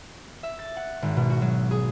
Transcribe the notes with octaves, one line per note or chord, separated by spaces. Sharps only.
E5
A6
F#5
G#1
B2
F#4
F#3
G#4